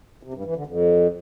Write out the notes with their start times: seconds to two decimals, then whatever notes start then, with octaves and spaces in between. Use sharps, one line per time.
0.23 C3
0.34 G2
0.45 E3
0.56 D3
0.67 F2